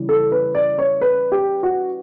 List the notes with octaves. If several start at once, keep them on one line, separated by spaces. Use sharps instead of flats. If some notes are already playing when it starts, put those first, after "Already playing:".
Already playing: C#3 E3 G3
A4
B4
D5
C#5
B4
G4
F#4